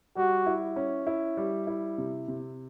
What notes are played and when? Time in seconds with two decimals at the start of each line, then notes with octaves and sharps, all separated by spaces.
0.16 G3 F#4
0.46 E4
0.76 C#4
1.07 E4
1.37 G3
1.67 E4
1.98 C3
2.28 C3